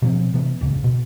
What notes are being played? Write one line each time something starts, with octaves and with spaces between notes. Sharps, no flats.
B2 F3 C4
C3 E3 B3
D1 G1 C#2 C#3
B2